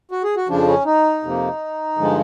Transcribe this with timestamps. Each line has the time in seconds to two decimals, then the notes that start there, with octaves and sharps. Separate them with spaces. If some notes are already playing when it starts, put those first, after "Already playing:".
0.11 F#4
0.24 G#4
0.37 F#4
0.49 F2 C#3 F3 D4
0.67 C#4
0.85 D#4
1.23 F2 C3 F3 A#3
1.97 G2 D3 F3 G#3